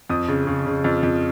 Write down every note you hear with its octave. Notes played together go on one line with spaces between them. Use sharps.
F2 D#6
C#3
C#3
C#3
F2
F2